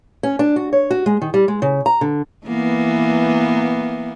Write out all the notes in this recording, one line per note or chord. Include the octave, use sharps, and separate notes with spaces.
C#4
D4
F#4
C#5
F#4
G#3
D#3
G3
G#3
C#3
A#5
D3
E3 A#3 B3